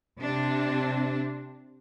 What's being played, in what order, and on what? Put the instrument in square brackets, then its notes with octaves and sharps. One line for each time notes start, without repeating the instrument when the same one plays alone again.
[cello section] C3 C4 D4